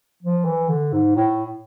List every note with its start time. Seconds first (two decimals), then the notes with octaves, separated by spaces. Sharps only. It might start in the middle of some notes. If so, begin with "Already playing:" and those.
0.22 F3
0.45 E3
0.69 D3
0.93 G#2
1.16 A2